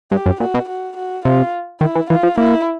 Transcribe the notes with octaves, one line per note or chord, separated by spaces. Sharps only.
G2 G4
F#2
A#2 F#4
B2
F#4
F#4
C3 F4
D#3 E4
E3
E3 F4
F3
A#3 E4